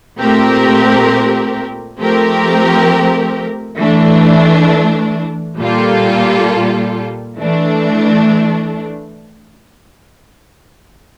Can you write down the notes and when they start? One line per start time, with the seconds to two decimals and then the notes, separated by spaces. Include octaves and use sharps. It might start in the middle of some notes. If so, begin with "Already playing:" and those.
0.18 A#2 A3 C4 G4 A#4
1.99 F3 A3 C4 G4 A#4
3.78 E3 A3 D4
5.58 A#2 G3 A#3 F4 A4
7.38 E3 A3 D4